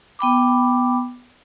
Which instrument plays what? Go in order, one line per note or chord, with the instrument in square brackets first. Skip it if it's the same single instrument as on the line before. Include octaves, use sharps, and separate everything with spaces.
[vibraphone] B3 G5 B5 D6